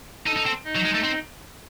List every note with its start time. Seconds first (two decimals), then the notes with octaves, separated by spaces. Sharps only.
0.26 D#4 A4 A5
0.36 D#4
0.46 C4
0.64 D#4 D#5
0.75 F#3
0.85 G#3
0.94 A3
1.03 C4